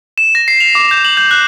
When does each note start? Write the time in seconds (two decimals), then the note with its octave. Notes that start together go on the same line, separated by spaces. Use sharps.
0.18 E7
0.35 A#6
0.48 C7
0.60 F7
0.75 D6
0.91 G6
1.05 F#7
1.17 G6
1.31 F#6